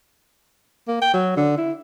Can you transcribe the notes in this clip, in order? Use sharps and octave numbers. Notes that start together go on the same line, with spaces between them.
A#3
G5
F#3
D3
E4